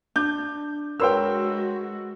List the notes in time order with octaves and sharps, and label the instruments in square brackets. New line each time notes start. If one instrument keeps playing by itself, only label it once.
[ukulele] D4 [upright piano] G6
[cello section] G#3 F#4 [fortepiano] A#4 B4 C#5 [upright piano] G5 C6 E6